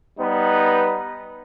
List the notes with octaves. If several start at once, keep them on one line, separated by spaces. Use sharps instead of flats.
G3 B3 D#4 B4